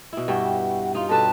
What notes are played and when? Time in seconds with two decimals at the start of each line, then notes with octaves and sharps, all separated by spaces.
0.13 B2 E4
0.28 G2 G3 F#4 E5 F#5 G5
0.95 D#4 F4 F5
1.09 B2 G3 C#4 A4 B4 A5